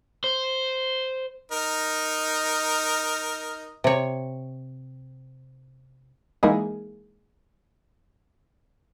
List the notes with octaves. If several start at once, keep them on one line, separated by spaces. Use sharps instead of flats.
C5
D#4 A#4
C3 C#5
E3 G#3 A#3 D#4 E4 G#4